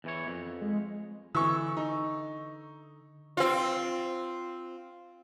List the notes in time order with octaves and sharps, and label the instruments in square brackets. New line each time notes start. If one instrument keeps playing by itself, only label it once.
[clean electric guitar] E2 E3 C#5
F2
[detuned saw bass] G#3
[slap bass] D3 [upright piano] E3 [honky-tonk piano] C#6 E6
[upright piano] D#4
[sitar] C4 F4